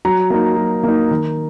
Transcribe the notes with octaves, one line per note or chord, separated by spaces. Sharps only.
F#3 A#5
A#3 D#4
F#3
A#3 D#4
D#3